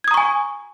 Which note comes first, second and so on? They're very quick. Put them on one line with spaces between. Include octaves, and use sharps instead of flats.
G#6 D#6 A#5 C#6 G#5